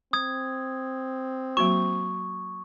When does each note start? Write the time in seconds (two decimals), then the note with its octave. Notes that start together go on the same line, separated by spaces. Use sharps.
0.13 C4 D#6 G#6
1.57 F#3 A#3 F#4 C#6